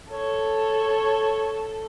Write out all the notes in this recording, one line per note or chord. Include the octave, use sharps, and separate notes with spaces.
A4 C#5